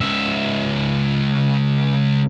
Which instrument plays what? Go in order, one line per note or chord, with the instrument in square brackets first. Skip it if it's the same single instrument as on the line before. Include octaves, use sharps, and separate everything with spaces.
[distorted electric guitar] C#2 E5